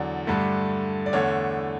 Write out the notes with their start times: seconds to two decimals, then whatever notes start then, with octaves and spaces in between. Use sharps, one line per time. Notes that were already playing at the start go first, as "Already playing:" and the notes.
Already playing: E2 D3 F#3 D5
0.27 G2 D3 A3
1.06 D5
1.13 E2 D3 A3 C#5